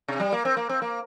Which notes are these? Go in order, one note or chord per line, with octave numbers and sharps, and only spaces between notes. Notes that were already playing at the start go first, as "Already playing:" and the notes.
C3
G3
A#3
C4
A#3
C4
A#3